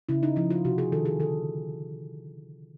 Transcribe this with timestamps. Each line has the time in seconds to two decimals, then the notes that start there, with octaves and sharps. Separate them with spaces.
0.09 C#3 E4
0.23 D#4
0.36 F3 E4
0.51 F4
0.65 C3 F#4
0.78 G#4
0.92 D#3 A4
1.05 G#4
1.20 D3 A4